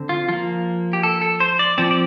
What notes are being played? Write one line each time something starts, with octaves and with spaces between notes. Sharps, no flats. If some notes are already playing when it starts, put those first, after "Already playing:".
Already playing: D3 C4
F4
F3 A#3 F4
G4
A4
A4
C5
D5
F3 C4 D5
D5